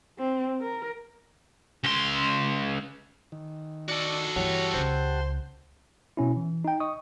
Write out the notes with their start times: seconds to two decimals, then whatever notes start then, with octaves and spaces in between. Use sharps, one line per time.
0.18 C4
0.61 A#4
1.84 C#2 C6
3.32 D#3
3.89 F#4 A4 D5
4.36 G2 E3 G4 C#5 F#5 A5
4.74 C#2 C#3 C5
6.17 B2 C#4 E4
6.36 E3
6.65 D#4 G5
6.80 D#5 C#6 D#6